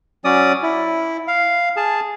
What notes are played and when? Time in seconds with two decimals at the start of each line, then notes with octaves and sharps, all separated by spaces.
0.25 F#3 C#4 D5 D#6
0.63 E4
1.28 F5
1.77 G#4 A5